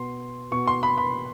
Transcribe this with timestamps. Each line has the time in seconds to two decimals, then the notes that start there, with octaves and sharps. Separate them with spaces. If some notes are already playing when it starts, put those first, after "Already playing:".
Already playing: B2 C6
0.51 B2 C#6
0.67 C6
0.83 B5
0.98 B5